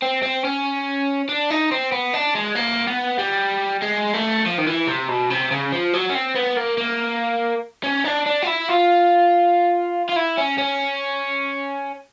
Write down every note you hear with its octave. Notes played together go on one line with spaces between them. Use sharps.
C4
C4
C#4
D4
D#4
C4
B3
D4
G#3
A#3
B3
G3
G#3
A3
F3
D#3
E3
C3
B2
C3
C#3
F3
F#3
C#4
C4
B3
A#3
A#3
C#4
D4
D4
F4
E4
F4
F4
E4
C#4
C#4